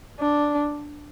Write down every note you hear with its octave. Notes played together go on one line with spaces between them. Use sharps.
D4